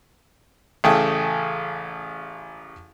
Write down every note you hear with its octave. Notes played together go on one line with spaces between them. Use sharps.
A1 C#3 A3 G#4 G5 A5